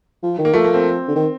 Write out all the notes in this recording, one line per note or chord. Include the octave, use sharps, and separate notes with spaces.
F3
D#3
A#3
F3 A3
A#3
C4
D3
D#3